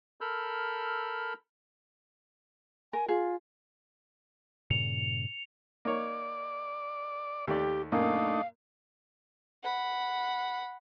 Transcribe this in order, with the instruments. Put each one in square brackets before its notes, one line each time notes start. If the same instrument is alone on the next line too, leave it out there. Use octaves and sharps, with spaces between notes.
[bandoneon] A4 A#4 B5 E6 F6 G6
[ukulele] A#4 [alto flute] G#5
[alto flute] F4 [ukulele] G#4
[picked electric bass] G2 A#2 C#3 [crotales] C#7 F7
[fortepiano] A#3 D#4 C#5 [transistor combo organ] D5
[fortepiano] D#2 A3 D5 [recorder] G4
[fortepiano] F#2 A#2 A#3 [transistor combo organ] A3 D4 D#4 [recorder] F5
[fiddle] F#5 B5